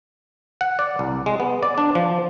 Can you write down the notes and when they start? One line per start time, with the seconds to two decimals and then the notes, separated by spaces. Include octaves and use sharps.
0.61 F#5
0.79 D5
0.99 C2
1.26 G#3
1.40 B3
1.63 D5
1.78 D4
1.95 F3